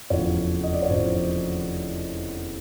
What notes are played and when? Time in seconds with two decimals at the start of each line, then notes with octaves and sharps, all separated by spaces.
0.10 F1 E2 C#3 F3 C#5
0.63 D#5
0.73 D5
0.82 C#5
0.90 F1 E2 C#3 F3 C5